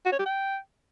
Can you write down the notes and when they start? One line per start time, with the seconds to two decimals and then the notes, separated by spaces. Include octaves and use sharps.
0.05 F#4
0.12 C#5
0.19 G4
0.26 G5